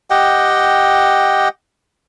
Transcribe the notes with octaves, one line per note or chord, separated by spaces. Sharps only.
G4 D#5 F#5 G5